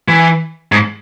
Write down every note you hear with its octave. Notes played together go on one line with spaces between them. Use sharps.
E3
G#2